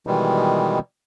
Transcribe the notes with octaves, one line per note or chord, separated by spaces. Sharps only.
B2 D#3 E3 G3 G#3